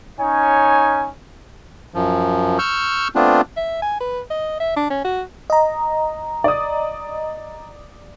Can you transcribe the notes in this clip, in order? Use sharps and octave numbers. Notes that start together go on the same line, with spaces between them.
C#4 D#4 C#5 G#5
F#2 F3
C#6 E6 F6 G6
A3 B3 C4 D4 F4
E5
G#5
B4
D#5
E5
D4
C#4
F#4
D#5 A#5
D5 D#6